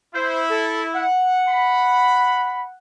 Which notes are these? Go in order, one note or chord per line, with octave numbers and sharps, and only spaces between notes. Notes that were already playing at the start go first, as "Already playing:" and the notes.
E4 C5
A4
F#5
B5